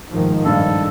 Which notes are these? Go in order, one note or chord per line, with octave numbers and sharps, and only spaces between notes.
G#2 D#3 F3
A#1 G2 A4 F5